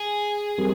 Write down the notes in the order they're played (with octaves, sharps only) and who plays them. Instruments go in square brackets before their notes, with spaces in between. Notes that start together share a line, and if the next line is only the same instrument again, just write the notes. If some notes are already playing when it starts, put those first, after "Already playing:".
Already playing: [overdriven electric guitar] G#4
[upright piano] G3 C4 G4 A#4